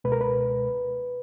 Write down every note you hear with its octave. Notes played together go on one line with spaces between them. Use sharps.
C#2 B2 G#3 B4
A#4
B4